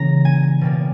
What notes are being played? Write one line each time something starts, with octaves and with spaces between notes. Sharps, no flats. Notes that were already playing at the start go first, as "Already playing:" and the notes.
Already playing: C#3 E3 G3 A#3 A#5
G#5
B2 G3 A#3